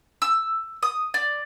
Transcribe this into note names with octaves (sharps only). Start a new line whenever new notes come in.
E6
D#6
D5